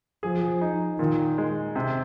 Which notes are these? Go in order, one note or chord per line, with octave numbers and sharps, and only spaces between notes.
F3 G#4
D#4
A#2 D#3
G#3
C3